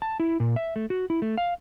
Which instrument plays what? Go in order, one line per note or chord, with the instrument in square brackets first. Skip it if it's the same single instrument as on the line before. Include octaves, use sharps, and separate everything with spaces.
[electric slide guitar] A5
E4
A#2
E5
A3
F#4
E4
A3
F5